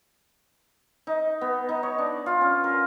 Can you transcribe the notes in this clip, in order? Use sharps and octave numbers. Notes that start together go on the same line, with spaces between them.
D#4
B3
D#4
C#5
D4
F4
C#4
A#4